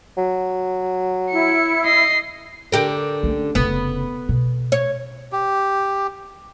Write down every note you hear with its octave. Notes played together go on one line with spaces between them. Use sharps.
F#3
E4 C#7
D#5 C7
D3 G4 A#4
A3 C#4
F1 C#3 B3
B2
C#5
G4